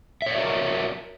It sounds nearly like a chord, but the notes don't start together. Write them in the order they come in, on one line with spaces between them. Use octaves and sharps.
E5 C#5 D5 F#4 A#4